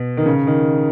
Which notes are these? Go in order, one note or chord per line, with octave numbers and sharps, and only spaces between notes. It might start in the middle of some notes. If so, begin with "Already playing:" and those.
Already playing: B2
D#3
C#3
D#3